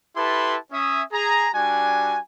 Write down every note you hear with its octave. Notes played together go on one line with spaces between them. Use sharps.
E4 G4 A4 B4 A5 C6
C#4 E5 D#6
G#4 A#5
G3 D4 F#4 G#5